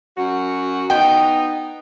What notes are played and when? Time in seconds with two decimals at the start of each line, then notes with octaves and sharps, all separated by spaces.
0.17 F#2 F#4
0.90 B3 D#4 G5